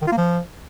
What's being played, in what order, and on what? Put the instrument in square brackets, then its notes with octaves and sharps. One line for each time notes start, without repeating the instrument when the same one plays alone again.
[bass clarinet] D#3
F4
A#3
F3